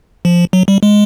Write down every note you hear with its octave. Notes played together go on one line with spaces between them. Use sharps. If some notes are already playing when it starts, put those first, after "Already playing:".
F3
F#3
G3
G#3